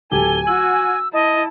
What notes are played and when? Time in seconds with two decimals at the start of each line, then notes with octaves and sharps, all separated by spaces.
0.11 D1 G4 A4 G#5 G7
0.47 F#4 E6 F#7
1.13 E4 D#5 A5